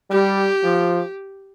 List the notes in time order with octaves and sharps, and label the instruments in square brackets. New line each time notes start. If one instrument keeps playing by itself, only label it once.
[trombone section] G3 [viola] G4
[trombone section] F3